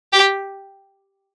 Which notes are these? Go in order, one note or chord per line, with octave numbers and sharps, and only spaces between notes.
G4